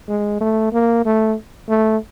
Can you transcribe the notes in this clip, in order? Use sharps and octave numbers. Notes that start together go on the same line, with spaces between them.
G#3
A3
A#3
A3
A3